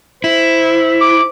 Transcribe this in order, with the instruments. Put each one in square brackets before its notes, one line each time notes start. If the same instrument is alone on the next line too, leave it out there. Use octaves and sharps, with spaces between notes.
[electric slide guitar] E4 [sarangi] C5
[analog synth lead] D6